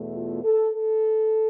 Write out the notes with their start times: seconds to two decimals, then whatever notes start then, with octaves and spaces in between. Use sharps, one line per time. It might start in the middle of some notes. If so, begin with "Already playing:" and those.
Already playing: E2 B2 A3
0.14 F4
0.43 A4
0.74 A4